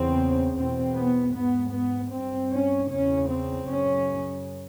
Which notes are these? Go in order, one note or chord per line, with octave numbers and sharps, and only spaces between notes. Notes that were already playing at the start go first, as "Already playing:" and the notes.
Already playing: E2 C#3 C4
E2 B2 C4
B3
G#2 B3
B3
G2 C4
C#4
E2 C#3 C#4
C4
F#2 C#3 C#4